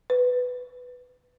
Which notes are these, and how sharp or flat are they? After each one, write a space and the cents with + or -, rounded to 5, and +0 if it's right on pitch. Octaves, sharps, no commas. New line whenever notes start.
B4 +10